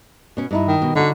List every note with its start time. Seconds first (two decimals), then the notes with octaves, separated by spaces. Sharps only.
0.37 B2 C#4
0.51 G2 D#4 E4
0.68 D#3
0.82 B2
0.95 D3 D#4 F#4